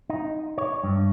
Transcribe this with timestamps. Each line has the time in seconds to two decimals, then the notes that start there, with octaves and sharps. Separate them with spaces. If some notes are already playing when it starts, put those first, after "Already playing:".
0.10 D#4
0.58 C#5
0.84 G2